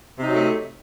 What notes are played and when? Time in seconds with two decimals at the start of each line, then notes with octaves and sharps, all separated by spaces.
0.19 C3
0.23 D#4
0.27 F#3
0.31 A3